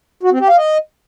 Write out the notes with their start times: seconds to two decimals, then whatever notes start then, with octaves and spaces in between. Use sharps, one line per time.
0.23 F#4
0.32 C4
0.40 G4
0.49 F5
0.58 D#5